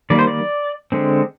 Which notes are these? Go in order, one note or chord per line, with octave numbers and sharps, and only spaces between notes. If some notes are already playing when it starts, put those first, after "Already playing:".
D#3 G3 A#3 D5
C5
D5
D3 G#3 C4